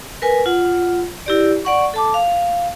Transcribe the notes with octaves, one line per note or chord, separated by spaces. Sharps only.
A#4 B4 G#5
F4 F#5
E4 G4 D5
D5 F#5 C#6
A4 A5 D6
F5